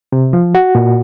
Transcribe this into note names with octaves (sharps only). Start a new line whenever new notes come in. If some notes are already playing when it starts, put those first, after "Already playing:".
C3
F3
F#4
A#2